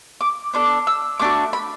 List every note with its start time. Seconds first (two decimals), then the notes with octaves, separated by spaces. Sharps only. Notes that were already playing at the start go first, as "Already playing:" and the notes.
0.21 D6
0.54 B3 D4 A4 D6
0.87 E6
1.20 A3 D4 F#4 D6
1.53 B5